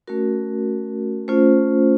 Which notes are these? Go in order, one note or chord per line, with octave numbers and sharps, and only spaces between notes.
A3 C#4 F#4 A#4
A3 C#4 F4 C5